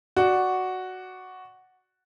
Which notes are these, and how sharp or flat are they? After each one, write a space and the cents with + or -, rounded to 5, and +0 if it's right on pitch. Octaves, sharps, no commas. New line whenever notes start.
F#4 +0 D5 +0